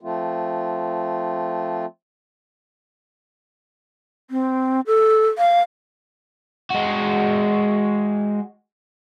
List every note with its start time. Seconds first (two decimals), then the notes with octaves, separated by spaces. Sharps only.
0.01 F3 A3 C4 F4
4.31 C4
4.87 A4
5.38 F5
6.70 G#3 F#4